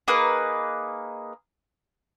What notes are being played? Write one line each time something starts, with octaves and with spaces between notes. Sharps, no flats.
A#3 D#4 G#4 B4